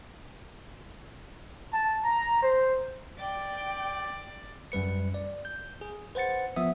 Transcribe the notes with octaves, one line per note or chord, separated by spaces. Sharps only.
A5
A#5
C5
D5 G5
F#2 G3 B4 C#7
D5
G6
G#4
B4 C5 F#5 A6 C#7
F3 B3 E5 D#6